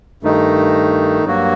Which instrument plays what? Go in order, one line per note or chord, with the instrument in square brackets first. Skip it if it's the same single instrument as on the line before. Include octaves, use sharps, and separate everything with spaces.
[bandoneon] G2 D#3 A3 D#4
G2 F#3 A#3 F#4